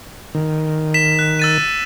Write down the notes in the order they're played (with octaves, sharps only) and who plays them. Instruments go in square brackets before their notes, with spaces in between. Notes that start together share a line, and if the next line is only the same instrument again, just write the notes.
[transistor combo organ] D#3
[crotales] B6 E7
F#6
E6 A6 D#7